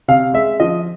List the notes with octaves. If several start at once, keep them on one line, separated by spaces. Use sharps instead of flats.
C3 F5
G#3 E5
F3 D#5